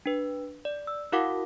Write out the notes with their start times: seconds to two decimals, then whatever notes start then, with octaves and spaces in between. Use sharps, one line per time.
0.06 D4 B4
0.65 D5
0.87 E6
1.12 E4 F#4 A#4 F5 F#5 D6